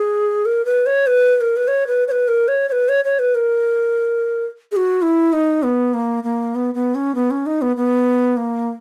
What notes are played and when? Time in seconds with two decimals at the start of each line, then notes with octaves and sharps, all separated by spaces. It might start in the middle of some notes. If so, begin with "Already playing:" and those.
Already playing: G#4
0.46 A#4
0.65 B4
0.86 C#5
1.07 B4
1.36 B4
1.41 A#4
1.57 B4
1.68 C#5
1.87 B4
2.08 C#5
2.11 B4
2.28 A#4
2.48 C#5
2.69 C#5
2.72 B4
2.89 C#5
3.05 C#5
3.19 B4
3.35 A#4
4.72 G#4
4.76 F#4
5.02 E4
5.33 D#4
5.63 B3
5.94 A#3
6.24 A#3
6.55 B3
6.74 B3
6.95 C#4
7.15 B3
7.31 C#4
7.46 D#4
7.62 B3
7.77 B3
8.37 A#3